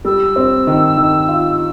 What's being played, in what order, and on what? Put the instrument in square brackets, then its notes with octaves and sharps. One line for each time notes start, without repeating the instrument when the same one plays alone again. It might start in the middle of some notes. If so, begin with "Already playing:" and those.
[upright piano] G3 [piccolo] E6
[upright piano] C4
D#3
D#3
F4